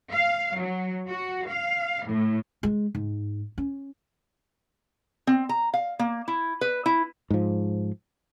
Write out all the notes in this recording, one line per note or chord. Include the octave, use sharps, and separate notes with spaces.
F5
F#3
F#4
F5
A2
G#3
G#2
C#4
C4
A#5
F5
A#3
E4
B4
E4
G#2 F3